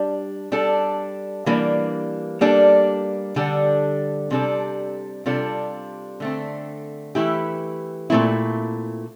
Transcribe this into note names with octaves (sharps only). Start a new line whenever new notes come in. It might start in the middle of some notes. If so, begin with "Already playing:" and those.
Already playing: G3 D4
G3 D4 A4
E3 G3 A#3 D4
G3 A#3 D4 A4
D3 G3 D4 A4
C3 G3 D4 A4
C3 G3 D4 F4 A4
D3 A3 C4
E3 A3 E4 G4
A#2 F3 A3 C4 E4